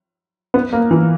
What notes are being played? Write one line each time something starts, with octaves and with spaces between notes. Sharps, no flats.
B3
A#3
E3